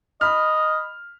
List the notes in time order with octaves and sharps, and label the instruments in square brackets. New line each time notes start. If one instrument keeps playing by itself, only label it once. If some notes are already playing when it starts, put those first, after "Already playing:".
[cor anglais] D#5 [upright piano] B5 F6